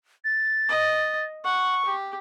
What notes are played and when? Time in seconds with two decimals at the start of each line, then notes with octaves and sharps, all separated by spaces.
0.25 A6
0.69 D#5
1.44 F#5 C#6
1.85 G4